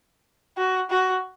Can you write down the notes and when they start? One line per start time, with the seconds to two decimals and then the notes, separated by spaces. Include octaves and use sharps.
0.57 F#4
0.90 F#4